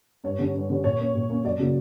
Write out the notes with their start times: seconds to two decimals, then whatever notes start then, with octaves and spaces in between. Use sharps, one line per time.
0.24 G2 C#5
0.39 D3 G3 C#4
0.54 G2
0.70 D3 G3 C#4
0.84 A#2 C#5
0.99 A#3 C#4
1.15 A#2
1.30 A#3 C#4
1.44 F#2 D5
1.59 C#3 F#3 A#3